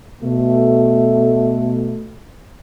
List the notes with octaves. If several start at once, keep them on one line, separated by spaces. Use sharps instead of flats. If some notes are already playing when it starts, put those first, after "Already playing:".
B2 A3